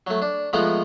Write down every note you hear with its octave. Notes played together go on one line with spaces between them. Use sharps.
F#3 A3
D4
F3 G#3 A3 B3 F#5 A#5